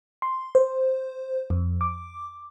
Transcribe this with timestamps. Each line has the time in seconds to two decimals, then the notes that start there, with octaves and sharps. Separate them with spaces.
0.22 C6
0.55 C5
1.50 F2
1.81 D6